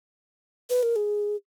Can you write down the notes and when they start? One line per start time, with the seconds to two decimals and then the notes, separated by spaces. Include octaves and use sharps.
0.70 B4
0.83 A#4
0.96 G#4